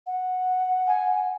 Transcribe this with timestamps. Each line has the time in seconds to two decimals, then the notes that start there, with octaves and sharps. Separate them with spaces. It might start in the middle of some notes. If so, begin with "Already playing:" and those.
0.07 F#5
0.87 G#5